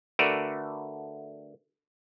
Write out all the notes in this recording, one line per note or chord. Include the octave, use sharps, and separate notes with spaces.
D3 A3 F#4 A#4 B4 D5